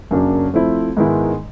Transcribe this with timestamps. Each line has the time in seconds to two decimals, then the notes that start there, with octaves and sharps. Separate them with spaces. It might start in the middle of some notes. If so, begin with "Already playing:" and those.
0.11 F#2 C#3 F#3 A#3 D4
0.54 F3 A3 C4 E4
0.97 G#2 D#3 G#3 B3 E4